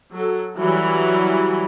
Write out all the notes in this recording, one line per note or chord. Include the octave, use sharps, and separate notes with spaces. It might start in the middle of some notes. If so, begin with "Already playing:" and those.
F#3 A4
E3 F#3 G3